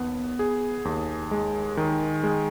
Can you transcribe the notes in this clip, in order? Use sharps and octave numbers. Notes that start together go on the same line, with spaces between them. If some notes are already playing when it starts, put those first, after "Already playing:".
Already playing: D#2 B3
G#4
D#2
G#3
D#3
G#3